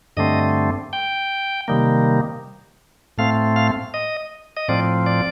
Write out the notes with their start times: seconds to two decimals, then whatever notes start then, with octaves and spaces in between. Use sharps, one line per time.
0.17 G2 D3 A3 C4 D#5
0.93 G5
1.68 C3 D#3 G3 A#3
3.18 A2 A3 C4 F5
3.56 F5
3.94 D#5
4.57 D#5
4.68 A2 F3 C4 D5
5.06 D5